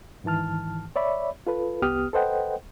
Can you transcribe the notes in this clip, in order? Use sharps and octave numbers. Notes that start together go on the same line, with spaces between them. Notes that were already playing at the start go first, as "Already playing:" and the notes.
G#2 D#3 E3 A5 F6
C#5 D5 E5 B5
F4 A4 B4
C2 B3 G4 D#6 F6
A4 B4 C5 D#5 F#5 G5